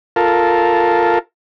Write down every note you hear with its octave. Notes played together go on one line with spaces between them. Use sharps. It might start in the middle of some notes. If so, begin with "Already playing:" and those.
F4 A4 A#4